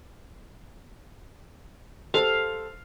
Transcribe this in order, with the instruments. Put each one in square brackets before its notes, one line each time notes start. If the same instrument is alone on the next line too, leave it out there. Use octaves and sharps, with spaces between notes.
[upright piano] G4 A4 C5 [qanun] F5